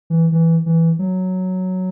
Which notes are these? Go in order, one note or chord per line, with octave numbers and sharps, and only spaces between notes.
E3
E3
E3
F#3